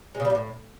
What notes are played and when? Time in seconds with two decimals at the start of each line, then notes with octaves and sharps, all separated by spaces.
0.15 G#3
0.20 C#3
0.25 G3
0.30 A#2
0.35 A2